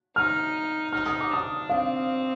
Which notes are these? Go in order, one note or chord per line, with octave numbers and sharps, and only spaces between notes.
D#4 F6
D#4 F6
D#6
D6
D4 D#6
C4 F5